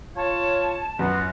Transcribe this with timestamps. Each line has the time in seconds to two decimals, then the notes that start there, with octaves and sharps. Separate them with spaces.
0.16 F4 C#5 A5
0.99 F#2 B3 F4 F#4